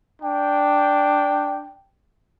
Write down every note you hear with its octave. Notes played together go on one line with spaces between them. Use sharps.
D4 G5